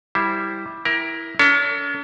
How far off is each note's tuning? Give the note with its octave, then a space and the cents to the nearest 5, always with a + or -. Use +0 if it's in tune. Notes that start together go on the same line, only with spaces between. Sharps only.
G3 +0 E4 +0 C5 +0
E4 +0 A#4 +20 G5 +0
C#4 +45 A4 +35